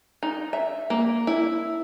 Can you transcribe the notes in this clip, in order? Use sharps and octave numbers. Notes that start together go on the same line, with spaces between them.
D#4
E5
A#3
E4